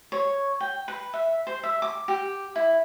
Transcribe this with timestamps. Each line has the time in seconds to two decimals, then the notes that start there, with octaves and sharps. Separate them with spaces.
0.12 C#5
0.60 G5
0.88 B4
1.14 E5
1.47 C5
1.63 E5
1.82 D6
2.08 G4
2.56 E4